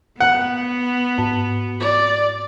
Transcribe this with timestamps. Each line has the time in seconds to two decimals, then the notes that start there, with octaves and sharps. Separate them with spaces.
0.20 B3 F#5
1.18 G#2
1.80 D5